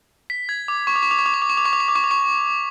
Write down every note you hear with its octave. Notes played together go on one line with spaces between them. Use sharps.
B6
G#6
D6
C#6
D6
C#6
D6
C#6
D6
C#6
D6
C#6
D6
C#6
D6
C#6
D6
C#6
D6
C#6